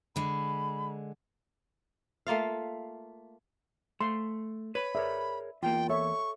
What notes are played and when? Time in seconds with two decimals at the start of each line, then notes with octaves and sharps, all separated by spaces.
0.16 D3 G#3 B5
2.27 A3 A#3 F4 F5
4.01 A3 C6
4.75 B4 C#5 B5
4.95 G#4 A#4 C#5 D5 E5
5.63 E2 A#3 F4 G5
5.89 A4 C#5 E5 C#6